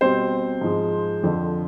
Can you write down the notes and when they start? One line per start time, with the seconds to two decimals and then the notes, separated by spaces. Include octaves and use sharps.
0.01 B2 G3 C4 C5
0.61 G#2 F3 G#3
1.23 F2 D3 F3